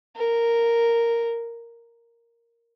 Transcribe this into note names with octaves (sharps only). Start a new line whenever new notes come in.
A#4